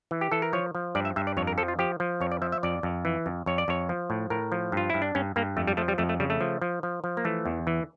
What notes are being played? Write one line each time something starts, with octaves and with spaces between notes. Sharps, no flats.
E3
G4
E3 A4
A#4
F3 C#5
F3
G2 D5
E5
G2 E5
D5
F2 C#5
A#4
F3 A4
F4
F3 G4
F3
F2 C#5
D5
F3 E5
E5
F2 D5
F2
E3
F2
F2 C#5
D5
F2 C#5
F3
A2
A2 A#4
F3
G2 F4
G2 E4
D4
G2 C#4
G2 A#3
F2 A3
G3
F3 A3
G3
F2 A3
A3
C#3 G3
A3
F3
F3
F3
F3
A#3
E3 A3
E2
E3